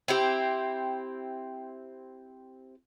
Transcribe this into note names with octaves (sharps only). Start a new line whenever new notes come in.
C4 E4 G4